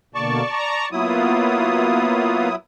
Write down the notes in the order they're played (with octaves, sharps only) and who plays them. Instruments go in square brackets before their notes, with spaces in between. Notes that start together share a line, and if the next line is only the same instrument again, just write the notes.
[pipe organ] B2 D3 A#3 [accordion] D5 A5 C#6
[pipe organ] A#5
[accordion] F#3 E4 D#6 [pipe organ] A#3 B3 F4